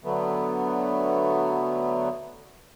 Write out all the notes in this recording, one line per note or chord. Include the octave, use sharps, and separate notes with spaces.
D3 F#3 A3 B3